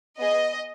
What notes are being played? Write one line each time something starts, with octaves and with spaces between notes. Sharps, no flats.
B3 G#4 D#5